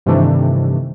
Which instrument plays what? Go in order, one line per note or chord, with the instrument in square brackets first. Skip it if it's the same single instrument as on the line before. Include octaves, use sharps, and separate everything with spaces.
[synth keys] G2 C3 D#3 E3 A3 D4